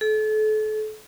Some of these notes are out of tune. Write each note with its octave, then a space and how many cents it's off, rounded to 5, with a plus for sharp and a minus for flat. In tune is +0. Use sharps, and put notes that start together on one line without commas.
A4 -35